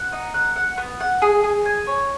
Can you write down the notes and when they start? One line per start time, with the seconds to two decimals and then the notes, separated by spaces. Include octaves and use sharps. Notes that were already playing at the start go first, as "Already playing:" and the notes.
Already playing: F#5
0.12 D#4
0.34 F#5
0.56 F#5
0.78 B3
1.00 F#5
1.22 G#4
1.44 G#4
1.66 G#5
1.87 C#5